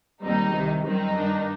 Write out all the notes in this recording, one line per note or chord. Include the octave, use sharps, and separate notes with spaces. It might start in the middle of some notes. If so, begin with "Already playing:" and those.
D#2 D#3 G3 C4 D#4
C2 C3 D#3
F#2 D#3 G3 C4 D#4
G2 D#3 G3 D4